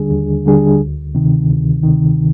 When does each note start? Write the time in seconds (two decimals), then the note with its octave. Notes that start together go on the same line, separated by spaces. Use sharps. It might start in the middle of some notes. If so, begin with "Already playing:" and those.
Already playing: D#2 D3 G3 D4 G#4
0.11 D#2
0.46 D3 G3 D4 G#4
0.80 D2
1.15 C3 D#3
1.50 D2
1.84 C3 D#3